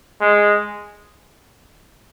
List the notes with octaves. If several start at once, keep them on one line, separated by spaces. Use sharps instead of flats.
G#3